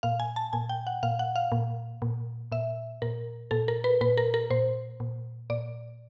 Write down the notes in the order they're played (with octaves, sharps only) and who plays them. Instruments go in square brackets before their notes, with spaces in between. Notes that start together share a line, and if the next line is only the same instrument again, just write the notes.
[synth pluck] A#2 F5
G#5
A5
A#2 G#5
G5
F#5
A#2 F5
F#5
F5
A#2
A#2
A#2 E5
A#2 A#4
A#2 A4
A#4
B4
A#2 B4
A#4
A#4
A#2 C5
A#2
A#2 D5